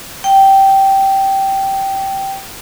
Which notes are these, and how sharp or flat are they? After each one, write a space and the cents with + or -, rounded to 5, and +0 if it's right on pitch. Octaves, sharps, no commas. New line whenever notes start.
G5 -10